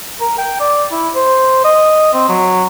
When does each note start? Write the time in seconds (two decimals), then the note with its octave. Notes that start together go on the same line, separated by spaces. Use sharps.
0.21 A#4
0.38 G5
0.60 D5
0.92 E4
1.15 C5
1.64 D#5
2.14 C4
2.29 F#3